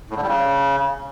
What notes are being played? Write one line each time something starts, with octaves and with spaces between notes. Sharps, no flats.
A2
D3
G3
C#3